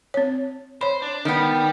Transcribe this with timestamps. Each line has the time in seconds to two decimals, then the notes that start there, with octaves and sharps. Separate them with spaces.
0.14 C4 C#5
0.81 C5 C#5 B5
1.02 D4
1.25 D#3 G3 B3 G4